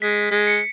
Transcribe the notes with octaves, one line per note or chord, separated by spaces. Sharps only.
G#3 B6
G#3
C#7